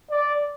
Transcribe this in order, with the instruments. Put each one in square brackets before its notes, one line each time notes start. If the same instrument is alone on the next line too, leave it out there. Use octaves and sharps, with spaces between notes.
[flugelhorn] D5